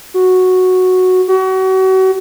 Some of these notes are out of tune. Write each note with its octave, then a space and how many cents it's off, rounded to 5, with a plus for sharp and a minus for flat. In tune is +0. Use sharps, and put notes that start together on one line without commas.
F#4 -5
F#4 +35